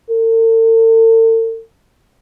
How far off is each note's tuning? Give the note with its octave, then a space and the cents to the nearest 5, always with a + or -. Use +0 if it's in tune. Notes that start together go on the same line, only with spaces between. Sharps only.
A4 +45